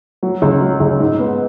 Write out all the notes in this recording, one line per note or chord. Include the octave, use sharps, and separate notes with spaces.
F#3
C#2
F#3
C#2
G#2
B3